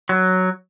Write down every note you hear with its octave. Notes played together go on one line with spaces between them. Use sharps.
F#3